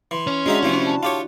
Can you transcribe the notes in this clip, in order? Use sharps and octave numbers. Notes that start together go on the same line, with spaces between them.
E3 C6
C#4
G#3 D4 D#4 F#4 E5
C3 F3 A3 E4
A5
F4 G4 C#5